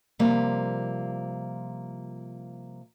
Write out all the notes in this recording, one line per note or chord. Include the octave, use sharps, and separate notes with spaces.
C3 F3 G3 A#3